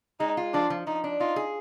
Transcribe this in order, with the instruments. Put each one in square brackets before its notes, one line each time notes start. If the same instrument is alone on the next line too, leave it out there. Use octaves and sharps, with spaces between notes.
[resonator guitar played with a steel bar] G#3 [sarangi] D#4
[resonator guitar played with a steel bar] F4
[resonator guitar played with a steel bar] F3 [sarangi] D4
[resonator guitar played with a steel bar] F3
[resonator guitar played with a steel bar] F3 [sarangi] D#4
[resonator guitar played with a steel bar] D4
[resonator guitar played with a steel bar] D#4 [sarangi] F4
[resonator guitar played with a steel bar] G#4